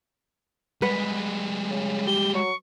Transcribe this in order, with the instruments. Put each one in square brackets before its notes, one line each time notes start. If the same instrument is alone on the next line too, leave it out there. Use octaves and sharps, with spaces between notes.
[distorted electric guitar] G3 G#3 [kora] B4 F#5
[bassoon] C#3
[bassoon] G4 [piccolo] G7
[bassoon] F#3 [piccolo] C#6